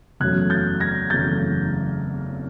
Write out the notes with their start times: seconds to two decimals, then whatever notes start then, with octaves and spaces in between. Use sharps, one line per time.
0.20 F#1 E2 C#3 F#3 A3 F#6 G#6
0.50 G6 A6
0.80 G#6 A#6
1.10 F#1 E2 C#3 F#3 A3 G6 A6